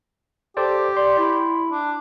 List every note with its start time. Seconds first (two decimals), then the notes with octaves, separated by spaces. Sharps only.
0.57 G4 A4 C5 D5
0.97 D5 C6
1.19 E4
1.71 D4